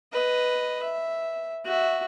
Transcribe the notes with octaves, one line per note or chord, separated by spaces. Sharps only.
B4 D#5
E5
F#4 E5